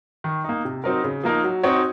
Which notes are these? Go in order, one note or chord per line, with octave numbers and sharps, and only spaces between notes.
D#3
A#3 D#4
C3
F#3 C4 D#4 A#4
C#3
F3 A#3 D#4 A#4
F#3
C4 D#4 F#4 C#5